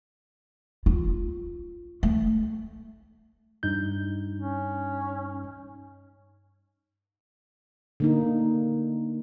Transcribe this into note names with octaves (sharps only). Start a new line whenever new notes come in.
F4
A3
G2 D#4 G6
C#4
D3 A#3 D#4